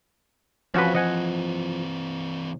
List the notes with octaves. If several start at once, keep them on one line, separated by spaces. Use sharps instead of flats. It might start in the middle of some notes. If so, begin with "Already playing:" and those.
E3 F3 C4 C#4 F#4 B4
D#5 F#5 G#5